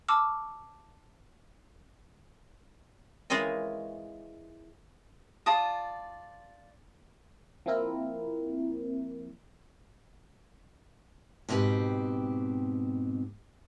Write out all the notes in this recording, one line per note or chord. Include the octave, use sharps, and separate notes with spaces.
A5 C#6 D6 E6 F6
E3 G#3 F4 A#4 C#5 D#5
F4 D5 A5 D#6
F3 A#3 C4 E4 A#4
G#2 B2 C4 G4 B4